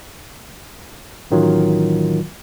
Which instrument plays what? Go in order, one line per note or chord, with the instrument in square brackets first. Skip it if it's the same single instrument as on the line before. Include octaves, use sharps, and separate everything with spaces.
[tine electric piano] A1 D#3 F#3 F4